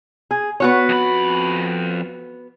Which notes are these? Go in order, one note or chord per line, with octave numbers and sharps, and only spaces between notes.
G#4
B3 F#4 C#5
F2 B5